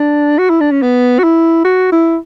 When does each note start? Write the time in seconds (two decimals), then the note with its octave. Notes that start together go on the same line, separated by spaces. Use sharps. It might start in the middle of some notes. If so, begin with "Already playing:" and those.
Already playing: D4
0.39 F#4
0.50 E4
0.60 D4
0.71 C#4
0.82 B3
1.19 F#4
1.24 E4
1.65 F#4
1.92 E4